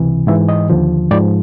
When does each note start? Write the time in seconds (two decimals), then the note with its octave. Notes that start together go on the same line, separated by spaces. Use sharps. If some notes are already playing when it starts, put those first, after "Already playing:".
Already playing: C#2 C3 E3
0.27 G#2 E3 E5
0.48 D#5
0.70 D#2 D3 F3
1.11 G#2 F3 D5